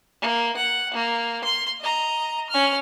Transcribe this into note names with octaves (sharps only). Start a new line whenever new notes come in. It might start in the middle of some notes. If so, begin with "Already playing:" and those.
A#3
F#5
A#3
C6
D#5 A#5
C#4 F6